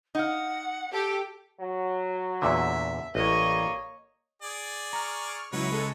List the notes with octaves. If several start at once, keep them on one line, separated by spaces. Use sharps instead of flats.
D#4 F5 F#5
G4 A4
F#3
E2 A#2 D3 E5
A1 G3 A#3 C#5 D#5
G#4 D5
A#5 C#6 F6
C#2 F#3 D#4 E4 B4 C#5
G#3 A4